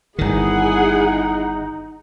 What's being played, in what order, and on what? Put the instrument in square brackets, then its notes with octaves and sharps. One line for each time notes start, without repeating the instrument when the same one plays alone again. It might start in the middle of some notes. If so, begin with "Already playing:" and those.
[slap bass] G1 D#3 [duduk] D#4 [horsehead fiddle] E4 F#5 [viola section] G#4